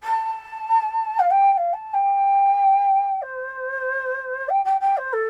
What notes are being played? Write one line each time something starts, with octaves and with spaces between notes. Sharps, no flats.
A5
F5
G5
G5
F5
A5
G5
C5
G5
G5
G5
C5
A4